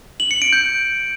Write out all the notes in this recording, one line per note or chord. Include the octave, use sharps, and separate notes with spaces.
F#7
C#7
D7
G6